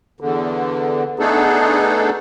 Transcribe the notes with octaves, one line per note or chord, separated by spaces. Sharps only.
E2 D3
A3 B3 D4 D#4 G#4 A4